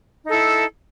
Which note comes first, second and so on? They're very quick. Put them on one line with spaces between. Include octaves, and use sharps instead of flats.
D#4 A4 E4